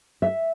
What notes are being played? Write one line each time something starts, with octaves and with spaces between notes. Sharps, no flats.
E5